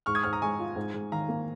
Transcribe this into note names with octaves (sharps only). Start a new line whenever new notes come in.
G#2 C#6 F6
D#6 G#6
G#2 C#6 F6
A#5 D#6
G#3 G#5 C#6
F4
G#2
G#2
D#3 F5 A#5
A#3